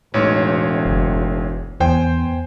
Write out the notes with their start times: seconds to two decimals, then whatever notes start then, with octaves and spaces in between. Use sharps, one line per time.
0.14 E1 A1 G#2 C#5
0.86 F#1
1.80 E2 B3 C5 G5 G#5